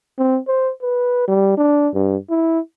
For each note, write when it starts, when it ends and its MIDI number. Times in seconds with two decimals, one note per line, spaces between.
0.18 0.39 60
0.48 0.71 72
0.82 1.24 71
1.28 1.55 55
1.57 1.89 62
1.94 2.16 43
2.30 2.59 64